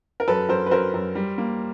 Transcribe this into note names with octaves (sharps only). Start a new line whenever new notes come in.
A#4
F#2 A4 B4
F#2 A#4 C5
B4
F#2 A#4 C5
F#2
G3
A#3